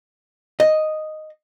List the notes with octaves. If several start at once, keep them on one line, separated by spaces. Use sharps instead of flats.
D#5